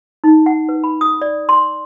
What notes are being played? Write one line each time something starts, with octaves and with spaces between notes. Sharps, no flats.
D#4
F#5
B4
B5
D#6
D5
C6